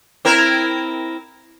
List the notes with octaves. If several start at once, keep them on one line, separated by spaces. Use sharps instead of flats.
C4 E4 A#4